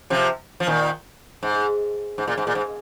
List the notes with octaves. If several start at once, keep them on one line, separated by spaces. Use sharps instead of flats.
C3 F3
F3
A#2 D#3
G#2
G#2
A#2
G#2
A#2
G#2